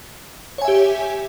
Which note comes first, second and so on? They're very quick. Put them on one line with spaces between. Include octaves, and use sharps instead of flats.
C#5 G#5 E5 G4